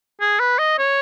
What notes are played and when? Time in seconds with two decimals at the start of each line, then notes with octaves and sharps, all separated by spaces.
0.21 G#4
0.40 B4
0.59 D#5
0.78 C#5